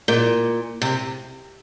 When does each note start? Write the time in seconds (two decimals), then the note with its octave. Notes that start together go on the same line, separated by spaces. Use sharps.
0.08 A#2
0.82 C3